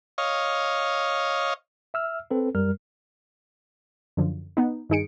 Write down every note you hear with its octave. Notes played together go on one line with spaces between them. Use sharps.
C#5 D#5 F5
E5 E6 F6
C4 A4 B4
F#2 G3 A#4 F6
F#2 D3 F3
B3 D#4
G2 D#3 D#4 G#4 C#7 D7